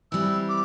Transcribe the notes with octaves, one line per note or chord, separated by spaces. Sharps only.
E3 G3 C4 E6
D6